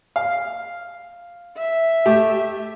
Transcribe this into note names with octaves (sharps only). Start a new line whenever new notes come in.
F5
E5
A3 G4